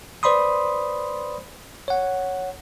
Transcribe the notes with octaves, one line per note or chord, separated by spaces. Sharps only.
B4 C5 D5 B5 C6 D#6
C#5 F#5